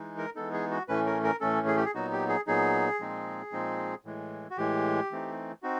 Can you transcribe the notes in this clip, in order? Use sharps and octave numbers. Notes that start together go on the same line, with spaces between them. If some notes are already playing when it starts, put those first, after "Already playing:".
Already playing: E3 G#3 D#4
A#4
E3 G#3 B3 D#4 A4
G#4
F#4
A2 E3 A3 C#4 B4
A#4
A#4
A2 E3 A3 C#4 A4
G#4
G4
G#4
A#2 F#3 B3 D#4 F#4
G4
G#4
A#2 F#3 B3 D#4 G#4
A#2 F3 G#3 C4 D#4
A#2 F3 G#3 C4 D#4
A2 E3 G#3
F#4
A2 E3 G#3 G4
E3 A3 C4 D#4
C4 D#4 F#4